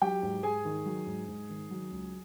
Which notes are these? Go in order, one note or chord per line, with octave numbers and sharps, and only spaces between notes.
F#3 G4 G5
G#2
G#2 G#4 G#5
D#3
F#3
G#2
G#2
D#3
F#3
C#2